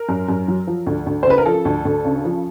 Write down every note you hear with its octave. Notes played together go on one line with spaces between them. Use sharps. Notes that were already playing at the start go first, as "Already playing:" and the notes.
Already playing: A#4
F#2
F#2
F#3
F3
D2
D2
C5
C#3 B4
A#4
F3 A4
D2
D2
C#3
F3